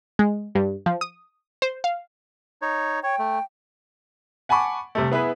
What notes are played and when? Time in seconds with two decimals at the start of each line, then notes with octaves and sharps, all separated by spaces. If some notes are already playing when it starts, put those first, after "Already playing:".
0.19 G#3
0.55 G2
0.86 F3
1.01 D#6
1.62 C5
1.84 F5
2.62 D#4 C#5
3.03 C#5 G5
3.19 A3
4.49 F#5 G#5 A5 B5 C#6 D6
4.95 C3 G3 A3
5.12 B3 E4 G#4 B4